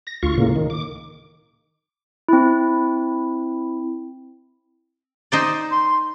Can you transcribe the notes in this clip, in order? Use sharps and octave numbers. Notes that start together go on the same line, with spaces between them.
A#6
D2 F4 C#6
A2 C#3 A#3
D#3
D6
C4 E4
D#4 C5 D5
C6